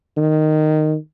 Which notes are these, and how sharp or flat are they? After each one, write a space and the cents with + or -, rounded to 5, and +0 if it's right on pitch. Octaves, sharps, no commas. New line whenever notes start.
D#3 -10